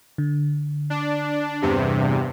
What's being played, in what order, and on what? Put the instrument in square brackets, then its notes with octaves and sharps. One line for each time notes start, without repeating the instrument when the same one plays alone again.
[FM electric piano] D3
[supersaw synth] D4
E2 G2 C3